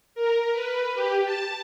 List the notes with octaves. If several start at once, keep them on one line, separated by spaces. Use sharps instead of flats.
A#4
B4
G4
A5